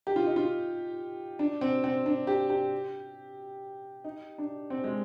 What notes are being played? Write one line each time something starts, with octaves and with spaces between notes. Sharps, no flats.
G4
F4
D#4
F4
D4
C4
C4
D4
G4
G4
D#4
D4
C4
G#3